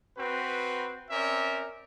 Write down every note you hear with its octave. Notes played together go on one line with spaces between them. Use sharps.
C4 F#4 B4
C4 C#4 A#4 D5 E5